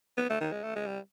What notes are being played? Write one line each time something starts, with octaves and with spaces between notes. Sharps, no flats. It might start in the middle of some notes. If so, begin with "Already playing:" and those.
B3
A3
D#3
G#3
A3
G#3
G3